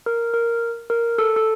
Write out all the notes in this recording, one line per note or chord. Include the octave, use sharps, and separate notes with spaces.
A#4
A#4
A#4
A4
A4